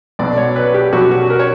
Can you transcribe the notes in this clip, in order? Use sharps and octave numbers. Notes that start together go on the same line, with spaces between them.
B1 B2 F#3 B3 D5
C#5
B4
G4
B1 B2 F#3 B3 F#4
F#4
A#4
C#5